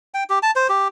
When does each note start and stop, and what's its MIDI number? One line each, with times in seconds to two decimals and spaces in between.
0.14 0.24 79
0.30 0.39 67
0.43 0.51 81
0.56 0.68 72
0.69 0.88 67